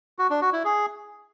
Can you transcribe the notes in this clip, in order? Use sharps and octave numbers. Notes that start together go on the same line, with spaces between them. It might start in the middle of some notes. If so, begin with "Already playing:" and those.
F#4
D4
F#4
E4
G#4